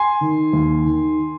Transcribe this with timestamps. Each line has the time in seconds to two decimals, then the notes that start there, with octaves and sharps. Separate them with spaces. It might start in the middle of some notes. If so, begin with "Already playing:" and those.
Already playing: G#5 C6
0.21 D#3
0.53 D#2
0.85 D#3